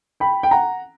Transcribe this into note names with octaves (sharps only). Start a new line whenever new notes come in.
G5 B5
G5
F#5 A#5